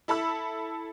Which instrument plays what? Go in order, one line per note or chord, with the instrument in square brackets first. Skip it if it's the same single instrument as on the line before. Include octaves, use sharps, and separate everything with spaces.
[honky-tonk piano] E4 A4 B5 E6